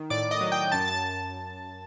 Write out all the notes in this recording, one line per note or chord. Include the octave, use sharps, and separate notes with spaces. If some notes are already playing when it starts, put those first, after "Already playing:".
Already playing: D#3
A2 D5 D6
D#5 D#6
F#3
G5 G6
F#2 A5 A6
A5 A6